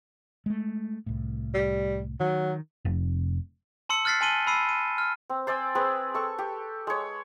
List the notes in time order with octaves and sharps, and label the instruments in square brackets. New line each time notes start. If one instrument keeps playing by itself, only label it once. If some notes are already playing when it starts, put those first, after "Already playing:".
[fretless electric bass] G#3 A3
C2 A2
[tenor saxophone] G3
[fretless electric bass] D#3 [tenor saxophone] F#3
[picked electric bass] F1
[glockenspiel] A5 C6 E6 C#7
F6 F#6 A6 B6 C7
G#5 A5 C6 D#7 G7
B5 E6 C7 D#7
D#7
F6
[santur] C4
C5 D5 G#5 E6
C4 G#4 B4
A4 C#6
G4
G#3 C#5